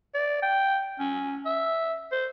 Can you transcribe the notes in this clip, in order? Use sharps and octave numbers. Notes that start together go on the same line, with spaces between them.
D5
G5
C#4
E5
C5